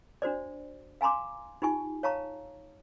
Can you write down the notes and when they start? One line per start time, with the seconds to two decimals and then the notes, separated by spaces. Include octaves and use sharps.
0.22 D4 F#4 C5 D5
1.01 F5 G#5 A#5 C6 D6
1.62 D#4 F4 G4 G#5 C#6
2.03 C#5 F5 A5 A#5 C#6